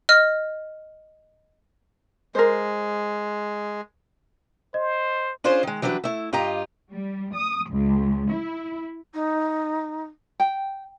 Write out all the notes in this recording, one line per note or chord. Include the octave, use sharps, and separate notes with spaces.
D#5 F6
G#3 A#4 C5
C5 D#5
C#4 D4 F4 G#4 C5
D#3 G#3
E3 F#3 G3 D4 B4
A3 E4
G2 F4 G4 D#5 A#5
G3
D#6
C#2
E4
D#4
G5